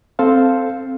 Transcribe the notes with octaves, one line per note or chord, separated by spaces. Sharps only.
C4 A4 C5 F5